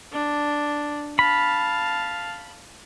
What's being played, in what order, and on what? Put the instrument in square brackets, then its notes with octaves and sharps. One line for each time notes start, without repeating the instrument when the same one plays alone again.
[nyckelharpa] D4
[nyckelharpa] F5 A5 [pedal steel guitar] B5